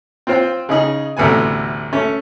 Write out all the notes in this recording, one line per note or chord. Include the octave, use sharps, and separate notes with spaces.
C4 F4 C5 G5
C#3 D#4 G#4
A1 D2 C3 B3 G#5
A3 C#4